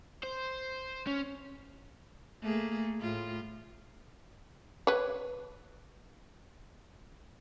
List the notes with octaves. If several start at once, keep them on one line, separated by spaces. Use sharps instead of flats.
C5
C#4
A3 A#3 G#4
A2 F4
B4 C#5